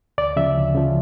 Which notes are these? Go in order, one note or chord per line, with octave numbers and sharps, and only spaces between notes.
D2 D5
C#3 F3 E5
D2
C#3 F3